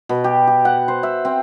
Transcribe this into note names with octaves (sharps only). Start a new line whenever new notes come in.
B2
G4
G4
F#5
C5
E5
C4